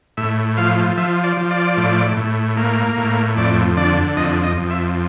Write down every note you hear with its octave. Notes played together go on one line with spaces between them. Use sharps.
A2 E5
F3 F5
F3 E5
D5
F3
D5
A2
A2
A#3
A2
F2 D5
D3 D5
F2 D#5
D#5
F2
E5